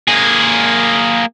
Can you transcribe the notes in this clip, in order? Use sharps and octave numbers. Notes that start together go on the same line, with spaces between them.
A#3 G#4